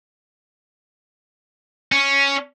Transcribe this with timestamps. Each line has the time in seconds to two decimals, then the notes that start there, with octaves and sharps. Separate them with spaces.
1.92 C#4